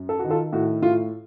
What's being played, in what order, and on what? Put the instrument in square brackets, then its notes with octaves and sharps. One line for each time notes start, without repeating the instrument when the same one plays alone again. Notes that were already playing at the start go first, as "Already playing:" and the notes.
Already playing: [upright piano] F#2
A4
D#3 F#4
F4 A4
A2 F#4
A2 F4